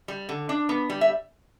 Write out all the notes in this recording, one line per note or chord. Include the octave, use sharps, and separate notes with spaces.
G3
D3
D4
B3
G3
E5